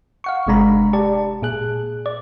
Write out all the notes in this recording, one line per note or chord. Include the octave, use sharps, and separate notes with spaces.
F5 F#5 C#6
G1 C3 G#3 D4 A#5 B5
G4 D5 A5
A#2 G#4 F#6
D5